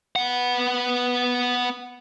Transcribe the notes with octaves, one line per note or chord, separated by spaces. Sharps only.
B3 F#5